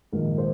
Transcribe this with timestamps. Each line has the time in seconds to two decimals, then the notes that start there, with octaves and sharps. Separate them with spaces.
0.12 A#1 G#2 D#3 A#4
0.38 C5